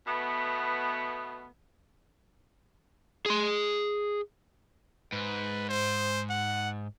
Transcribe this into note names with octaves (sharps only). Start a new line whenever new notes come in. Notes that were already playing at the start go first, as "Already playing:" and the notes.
B2 A3 B3
G#4 C6
G#2 B4
C5
F#5